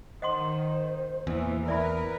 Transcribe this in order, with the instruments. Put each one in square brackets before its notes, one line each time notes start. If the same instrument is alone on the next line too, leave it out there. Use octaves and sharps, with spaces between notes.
[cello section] D#3 [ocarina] C5 [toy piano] D#5 F#5 C6
[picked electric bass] E2 [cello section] A#2 E3
[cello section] A#4 B4 [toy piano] D5 E5 B5